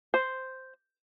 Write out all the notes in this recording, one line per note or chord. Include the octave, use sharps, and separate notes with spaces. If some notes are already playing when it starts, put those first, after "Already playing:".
C5